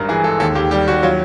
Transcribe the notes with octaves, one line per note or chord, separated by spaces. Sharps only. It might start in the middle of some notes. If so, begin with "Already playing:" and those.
Already playing: G#1 G2 A#4
E3 G#4
G#3 A4
D#2 A4
D#2 G4
G3 G4
D#2 F#4
F#3 F4